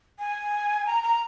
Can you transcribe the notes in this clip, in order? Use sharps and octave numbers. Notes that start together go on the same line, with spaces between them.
G#5
A#5
A#5